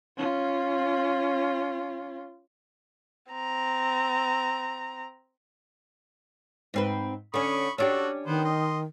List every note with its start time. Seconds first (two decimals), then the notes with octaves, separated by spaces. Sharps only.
0.17 C#4 F4
3.32 C4 A#5
6.74 G#2 C4 B4
7.34 D3 C#4 B5 C#6 D#6
7.78 C#4 D4 F#4 G4 A4
8.26 D#3 B3 C5
8.44 D#5 C6